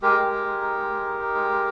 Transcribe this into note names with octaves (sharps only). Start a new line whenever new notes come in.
G#3 G4 A#4
G#3
G#3
G#3
D#4
G#3
G#3
D#4
D#4
G#3
G#3